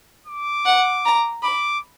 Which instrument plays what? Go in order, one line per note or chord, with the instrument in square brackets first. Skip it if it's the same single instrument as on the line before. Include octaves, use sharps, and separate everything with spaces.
[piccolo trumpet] D6
[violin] F#5
A#5
[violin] B5 [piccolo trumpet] D6